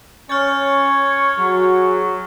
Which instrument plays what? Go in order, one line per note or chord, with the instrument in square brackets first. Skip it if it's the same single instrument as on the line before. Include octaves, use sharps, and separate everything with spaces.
[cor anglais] C#4 [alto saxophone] C#5 [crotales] F6 G6 A6
[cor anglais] F#3 [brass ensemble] F#4 G#4